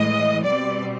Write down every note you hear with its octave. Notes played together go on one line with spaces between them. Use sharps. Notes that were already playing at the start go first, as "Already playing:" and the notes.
Already playing: A2 E3 G#3 D#5
B2 G3 C4 D5